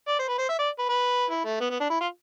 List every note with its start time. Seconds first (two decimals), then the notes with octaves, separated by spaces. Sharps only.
0.08 D5
0.19 C5
0.28 B4
0.38 C5
0.49 E5
0.59 D5
0.79 B4
0.89 B4
1.30 E4
1.45 A3
1.60 B3
1.70 B3
1.80 D4
1.90 E4
2.01 F4